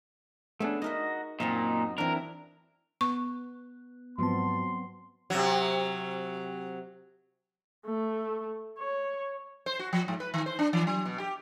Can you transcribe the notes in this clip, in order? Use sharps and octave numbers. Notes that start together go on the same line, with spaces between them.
A3 B3 C#4 D4 G#4
D#4 F#4 A#4 D#5 E5
F#2 A#2 C4 D#4 A5
E3 C4 D4 E4 A#4
B3 C#6
G#2 F3 F#3 B3 C4 A5 C6
C3 F#3
A3
C#5
C5
F#4
F3
G#2
B4
D#3
C5
D4
E3
F#3
B2
G4